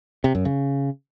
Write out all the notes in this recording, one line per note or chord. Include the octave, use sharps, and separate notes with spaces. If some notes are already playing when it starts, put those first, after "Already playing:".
C3
F#2
C#3